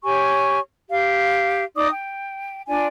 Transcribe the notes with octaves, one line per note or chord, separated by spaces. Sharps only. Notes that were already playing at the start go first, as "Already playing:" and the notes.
G4 C#5 G#5 C#6
G4 F5
D#4 D5 D6 D#6
G5
D4 F4 D5 G#5